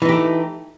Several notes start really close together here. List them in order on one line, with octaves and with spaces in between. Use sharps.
E3 D#4 G4 A3